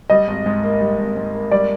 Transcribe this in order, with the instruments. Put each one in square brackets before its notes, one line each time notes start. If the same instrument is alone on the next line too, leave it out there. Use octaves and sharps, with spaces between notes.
[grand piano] G3 [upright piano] D#5
[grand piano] G#1
G#2
A#3
G3
G#1
G#2
A#3
[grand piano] G3 [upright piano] D5